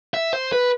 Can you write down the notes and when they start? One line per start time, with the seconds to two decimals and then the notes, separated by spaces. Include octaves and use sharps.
0.14 E5
0.33 C5
0.52 B4